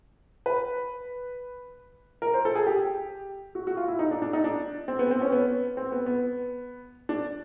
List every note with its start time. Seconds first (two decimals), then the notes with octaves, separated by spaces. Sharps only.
0.46 B4
2.22 A#4
2.34 C5
2.45 A4
2.55 G#4
2.67 G4
3.55 F#4
3.67 F#4
3.77 F4
3.88 E4
3.99 D#4
4.11 D4
4.22 D4
4.33 D#4
4.44 D4
4.88 C4
4.99 B3
5.11 C4
5.21 C#4
5.32 B3
5.77 C4
5.92 B3
6.06 B3
7.09 D4